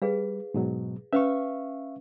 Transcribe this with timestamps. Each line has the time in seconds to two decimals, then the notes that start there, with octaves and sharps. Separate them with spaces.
0.02 G3 G#4 B4 F5
0.54 G#2 B2 F#3
1.13 C#4 B4 E5 F5 C#6